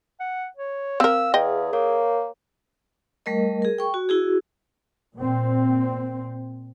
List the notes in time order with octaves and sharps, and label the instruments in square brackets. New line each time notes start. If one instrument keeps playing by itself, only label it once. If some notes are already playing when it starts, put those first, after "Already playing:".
[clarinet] F#5
C#5
[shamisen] C4 A#4 [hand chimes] F5 [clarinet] E6
[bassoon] E2 [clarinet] G#4 [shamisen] D#5 G5
[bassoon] A#3 [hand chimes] A#4 C#5
[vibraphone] G3 A3 A#4 D#5
G#4 A#4
G5 C#6
F#4
E4 F#4 G#4
[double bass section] A#2 C4